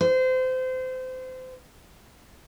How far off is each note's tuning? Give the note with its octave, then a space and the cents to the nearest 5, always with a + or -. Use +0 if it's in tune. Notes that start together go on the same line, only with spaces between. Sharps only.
C5 -25